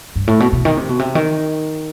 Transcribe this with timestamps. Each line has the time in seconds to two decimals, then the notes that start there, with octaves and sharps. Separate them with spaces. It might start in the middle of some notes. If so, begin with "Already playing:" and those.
0.16 G2
0.27 A2
0.40 B2
0.53 B2
0.65 D#3
0.77 C3
0.89 B2
0.99 C3
1.15 D#3